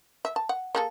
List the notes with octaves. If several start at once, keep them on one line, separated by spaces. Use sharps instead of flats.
E5
A5
F#5
A#3 G#4 A4